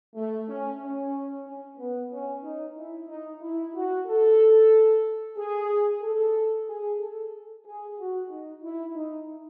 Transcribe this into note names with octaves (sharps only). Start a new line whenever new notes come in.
A3
C#4
C#4
C#4
B3
C#4
D#4
E4
D#4
E4
F#4
A4
G#4
A4
G#4
A4
G#4
F#4
D#4
E4
D#4